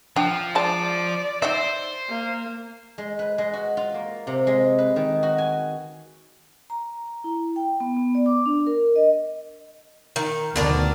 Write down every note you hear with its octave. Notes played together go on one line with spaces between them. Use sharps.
F3 D4 G5
G#3 C5 D5 A5
D#4 C5 D#5 E5
A#3
G#3
B4
G#3
F#4
F4
A#3
C3
G#3
B4
D#3
F#4
G#5
A#5
E4
G5
B3
B3
D5
D6
D4
A#4
D#5
D#3
D2 B2 D#3 D4 A#4